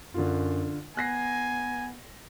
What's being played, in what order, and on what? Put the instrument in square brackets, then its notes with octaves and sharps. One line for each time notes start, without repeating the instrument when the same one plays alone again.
[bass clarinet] F#2 [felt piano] D3 F4
[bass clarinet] B3 [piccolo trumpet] G#5 [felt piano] F#6 A#6 C7